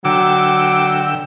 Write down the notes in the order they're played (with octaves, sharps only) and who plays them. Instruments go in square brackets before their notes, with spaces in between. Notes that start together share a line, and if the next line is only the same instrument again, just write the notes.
[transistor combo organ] D3 G5 E6 [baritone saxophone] F#3 [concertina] D6